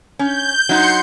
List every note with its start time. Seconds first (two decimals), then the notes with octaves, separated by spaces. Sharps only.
0.19 C#4 G6
0.69 F#3 D#4 C6 G6 C#7